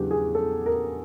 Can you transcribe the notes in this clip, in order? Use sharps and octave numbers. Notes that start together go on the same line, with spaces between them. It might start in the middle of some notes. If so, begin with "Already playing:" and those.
Already playing: E2 C#3 F#3 B3 D4 G4 G#4
G#4
A4
A#4